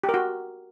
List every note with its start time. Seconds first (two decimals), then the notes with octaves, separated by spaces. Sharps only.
0.04 G4
0.09 A#4
0.14 F#4